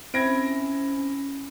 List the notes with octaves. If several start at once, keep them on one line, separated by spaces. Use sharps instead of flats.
C4 C#4 E4 G#6 A#6 D7